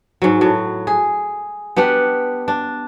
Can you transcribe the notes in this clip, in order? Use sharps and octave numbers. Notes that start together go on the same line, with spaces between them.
G#2 F#3
A2 F#3
G#4
B3 D4 G4 F#5
D4